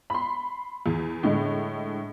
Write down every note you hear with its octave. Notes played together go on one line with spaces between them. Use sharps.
B5 C6
E2
A2 D3 G#3